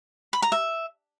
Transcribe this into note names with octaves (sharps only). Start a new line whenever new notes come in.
B5
A#5
E5